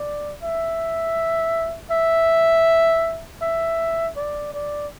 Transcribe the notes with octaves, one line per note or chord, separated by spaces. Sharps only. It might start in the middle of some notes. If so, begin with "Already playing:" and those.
Already playing: D5
E5
E5
E5
D5
D5